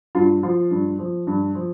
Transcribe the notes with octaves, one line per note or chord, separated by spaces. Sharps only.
G2 F4
F3 F4
G2
F3
G2
F3